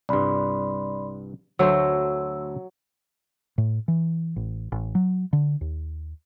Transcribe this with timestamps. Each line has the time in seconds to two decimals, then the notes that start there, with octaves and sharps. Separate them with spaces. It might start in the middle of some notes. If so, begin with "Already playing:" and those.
0.09 C2 G2 D5 B5 C6
1.59 D2 F#3 A3 C5 E6
3.58 A2
3.88 E3
4.36 A1
4.72 A1
4.95 F#3
5.33 D3
5.61 D#2